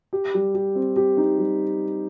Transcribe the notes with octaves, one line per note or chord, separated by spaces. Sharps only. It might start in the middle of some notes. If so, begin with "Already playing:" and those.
G4
G3
G4
C4
G4
D#4
G3